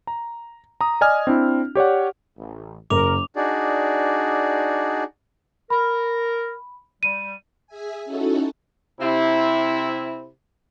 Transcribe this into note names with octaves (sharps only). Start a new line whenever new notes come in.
A#5
A#5 D#6
D5 D#5 G#5 D#6 F6
C4 D4 E4
G4 C#5 D5 F#5
A1
F#1 A#4 D6 F7
D4 D#4 F#4 G#4 D5
A#4 B5
G3 D#7
G#4 E5 G#5
C#4 D#4 E4 F#4 A4
C3 C4 E4